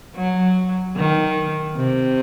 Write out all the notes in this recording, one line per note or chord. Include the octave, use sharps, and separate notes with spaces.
F#3
D#3
C3